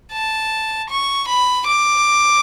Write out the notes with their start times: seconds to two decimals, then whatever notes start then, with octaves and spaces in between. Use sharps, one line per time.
0.13 A5
0.90 C#6
1.28 B5
1.67 D6